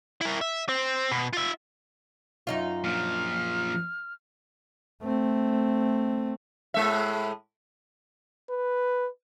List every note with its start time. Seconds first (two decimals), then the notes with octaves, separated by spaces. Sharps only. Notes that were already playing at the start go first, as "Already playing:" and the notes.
0.21 E4 A#4
0.41 E5
0.69 C4
1.11 B2
1.33 F4 E5
2.47 F#2 D#4 F4
2.84 A#2 F3 F6
5.03 A3 C4
6.74 A2 G#3 E5
8.50 B4